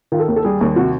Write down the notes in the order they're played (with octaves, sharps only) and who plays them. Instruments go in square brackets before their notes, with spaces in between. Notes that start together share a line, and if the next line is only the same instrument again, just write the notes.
[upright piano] D#3 F4
A4
D#2
A4
G3 G#4
D#2
C3 F#4